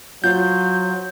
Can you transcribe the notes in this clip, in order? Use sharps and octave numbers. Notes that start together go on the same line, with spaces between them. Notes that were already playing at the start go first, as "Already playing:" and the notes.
F#3 F4 C5 G6